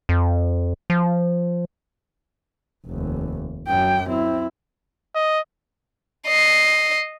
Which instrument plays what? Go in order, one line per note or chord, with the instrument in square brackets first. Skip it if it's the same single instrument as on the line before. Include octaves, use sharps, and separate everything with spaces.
[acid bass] F2
F3
[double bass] F1 D#2
[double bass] F#2 F#3 [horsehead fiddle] G5
[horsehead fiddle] C4 [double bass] E4
[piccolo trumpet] D#5
[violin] D#5 C7